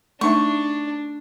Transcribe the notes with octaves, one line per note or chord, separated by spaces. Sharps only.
A3 D4 D#4 E5 C#6